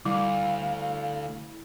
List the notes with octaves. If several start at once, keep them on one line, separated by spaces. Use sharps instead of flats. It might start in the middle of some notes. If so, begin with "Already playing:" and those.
D2 G3 E4 F5